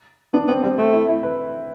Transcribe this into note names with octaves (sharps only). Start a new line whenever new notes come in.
B3 D4
B3 C4
G3 C4
A3 C4
E4
E4
B4